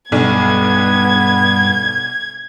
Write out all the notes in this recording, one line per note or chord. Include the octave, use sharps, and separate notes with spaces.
B1 G2 B3 D4 G#6